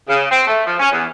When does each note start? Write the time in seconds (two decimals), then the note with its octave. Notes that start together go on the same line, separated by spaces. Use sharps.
0.08 C#3
0.30 C4
0.47 A3
0.66 F3
0.79 C#4
0.91 E2